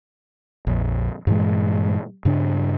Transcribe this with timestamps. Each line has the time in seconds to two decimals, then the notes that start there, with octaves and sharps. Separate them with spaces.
0.67 A#1 F2
1.27 G2 A#2 E3 G#3
2.25 G2 C#3 D4